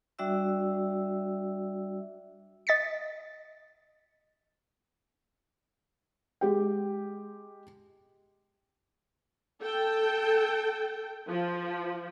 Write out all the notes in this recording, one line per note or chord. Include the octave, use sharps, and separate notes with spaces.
G3 D4 F#4 D5 E5 E6
D#5 A6 B6 C#7
G#3 G4 G5
A4 G5
F3